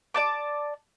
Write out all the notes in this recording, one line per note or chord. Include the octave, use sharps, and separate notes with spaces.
D5 A5 D6